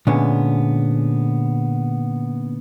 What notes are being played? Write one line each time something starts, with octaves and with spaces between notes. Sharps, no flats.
A#2 D3 G#3 B3 C#4